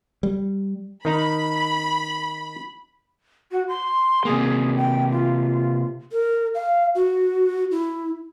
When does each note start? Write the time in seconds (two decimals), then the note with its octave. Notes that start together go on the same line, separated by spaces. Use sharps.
0.23 G3
1.05 D#3 D#4 A#5 B5
3.52 F#4
3.68 C6
4.25 C3 A#3 G#4
4.77 G5
5.12 F4
6.12 A#4
6.54 F5
6.95 F#4
7.71 E4